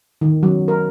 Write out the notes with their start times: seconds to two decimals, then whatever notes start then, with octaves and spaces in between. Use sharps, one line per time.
0.21 D#3
0.43 F#3
0.68 A#4